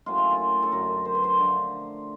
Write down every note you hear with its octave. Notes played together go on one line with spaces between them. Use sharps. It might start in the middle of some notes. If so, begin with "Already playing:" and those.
A2 F#3 A#3 C#4 F4
E4
F4
A4
F#2 D3 F#3 A#4
C5
B4
C5
D3 F3 A3